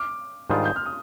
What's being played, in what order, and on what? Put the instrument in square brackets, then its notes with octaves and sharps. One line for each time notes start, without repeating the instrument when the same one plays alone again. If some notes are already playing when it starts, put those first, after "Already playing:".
Already playing: [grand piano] D6 F6
[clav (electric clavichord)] G#2 D#3 G3 D4 F4 [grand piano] D#6 G6
[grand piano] G6
F6
D#6